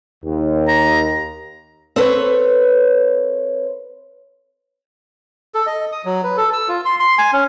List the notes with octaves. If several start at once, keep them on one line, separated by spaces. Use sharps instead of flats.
D#2
A#5
C4 A4 B4 C#5
A4
D#5
D#6
F#3
B4
A4
E6
F4
C6
C6
G#5
C#4